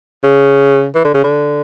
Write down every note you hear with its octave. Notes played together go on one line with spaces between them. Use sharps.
C#3
E3
D3
C#3
D3